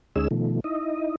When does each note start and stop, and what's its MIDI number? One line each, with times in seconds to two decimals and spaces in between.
0.16 0.28 38
0.16 0.28 56
0.16 0.28 61
0.16 0.28 63
0.16 0.28 68
0.16 0.28 88
0.31 0.60 47
0.31 0.60 51
0.31 0.60 53
0.31 0.60 57
0.64 1.15 63
0.64 1.15 64
0.64 1.15 75